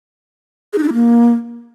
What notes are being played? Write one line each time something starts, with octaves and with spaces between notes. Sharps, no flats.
G#4
D#4
D4
E4
A#3